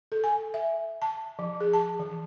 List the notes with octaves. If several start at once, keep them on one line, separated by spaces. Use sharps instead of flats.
A4
G#5
E5
A5
F3
G#4
A5
E3